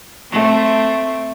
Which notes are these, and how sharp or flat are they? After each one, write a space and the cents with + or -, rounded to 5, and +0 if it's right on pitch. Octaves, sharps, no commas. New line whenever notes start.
A3 +0 C4 +0